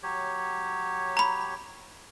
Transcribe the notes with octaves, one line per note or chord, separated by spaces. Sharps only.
F#3 G4 C#5
A#5 B5